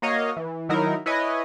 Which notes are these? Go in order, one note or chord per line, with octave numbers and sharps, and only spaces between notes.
A#3 F#4 C#5 D#5 F5
E3
D#3 F#3 D#4 E4 A#4
E4 B4 C#5 D#5 G#5